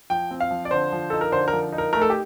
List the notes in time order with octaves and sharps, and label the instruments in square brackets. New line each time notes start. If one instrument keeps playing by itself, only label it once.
[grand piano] F3 G5
C4
F5
F3
D5
D3 C5
F3
D#4 A4
A#4
D3 C5
F3 A#4
D#4
A#4
A3 A#4
A4
G4